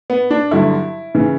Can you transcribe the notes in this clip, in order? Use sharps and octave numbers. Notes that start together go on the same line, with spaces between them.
B3
D4
G2 D3 F#3 E4
C#3 E3